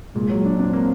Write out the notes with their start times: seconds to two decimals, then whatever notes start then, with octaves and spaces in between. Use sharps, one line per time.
0.15 A#2 G#3
0.30 F#3
0.45 D4
0.59 C4 D4
0.73 A#3